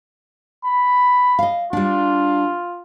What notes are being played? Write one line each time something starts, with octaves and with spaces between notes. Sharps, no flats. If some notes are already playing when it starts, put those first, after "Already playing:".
B5
D#5 F5
G3 D4 F4